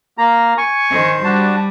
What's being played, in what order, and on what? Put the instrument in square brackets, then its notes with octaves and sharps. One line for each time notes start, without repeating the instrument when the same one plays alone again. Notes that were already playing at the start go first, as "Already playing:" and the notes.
[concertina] A#3 A#5
G#5 C#6
[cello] D#3 C5
[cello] G3 [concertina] D4 F#4 A5